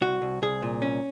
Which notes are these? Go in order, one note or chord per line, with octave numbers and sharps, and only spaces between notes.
C2 F#4
C2
C2 G#4
A#2
C2 C#4